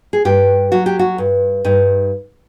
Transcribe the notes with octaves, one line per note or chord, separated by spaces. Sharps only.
G#4
G2 G4
F#3 F#4
G4
F#4
G2
G2 D#4